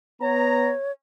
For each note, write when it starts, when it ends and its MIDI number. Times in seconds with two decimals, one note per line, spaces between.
0.22 0.71 59
0.22 0.92 73
0.22 0.71 82